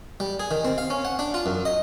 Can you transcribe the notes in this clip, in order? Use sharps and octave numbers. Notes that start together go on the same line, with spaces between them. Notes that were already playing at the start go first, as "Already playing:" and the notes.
G3
G#4
D#3
C4
F5
C#4
F#5
D4
F4
F#2
D#5